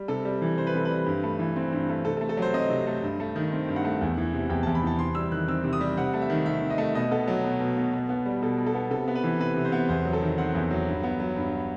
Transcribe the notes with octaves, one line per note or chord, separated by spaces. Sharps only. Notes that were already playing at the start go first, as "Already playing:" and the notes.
Already playing: G3
C3 A4
G3
E3
C3 C5
B4
C3 A4
G3 B4
G2
A3
E3
C4
G2
A3
C3 A4
A4
A3
A4
F#3 C5
C4 D#5
C3
A3
G2
A3
D#3
C4
G2
F#5
A3
E2
E3
C3
E2 G5
E2 A5
B5
E3 A5
C3 C6
G3 E6
D#3 F#6
C4 E6
C3
D#6
G3
C3 F#5
A3
E5
D#3
C3 E5
C3
D#5
A3
B2 D#5
B3 A4
F#3
B2
B2
B3
B2
B3
G3
B2 A4
B2
A4
B3
C3 A4
B3
B4
E3
C3 B4
C3
C5
B3
E2 C5
F#3
A4
D#3
C4 F#5
E2
F#3
G2
B3
F#3
G2